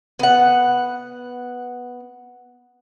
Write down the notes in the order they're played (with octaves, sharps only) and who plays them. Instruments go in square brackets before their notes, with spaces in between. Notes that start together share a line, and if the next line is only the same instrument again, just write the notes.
[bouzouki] B3 F#5